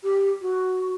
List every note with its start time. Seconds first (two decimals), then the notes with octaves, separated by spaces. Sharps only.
0.03 G4
0.41 F#4